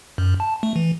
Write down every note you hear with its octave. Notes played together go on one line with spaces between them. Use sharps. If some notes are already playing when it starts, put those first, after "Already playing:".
F#2
A5
A3
E3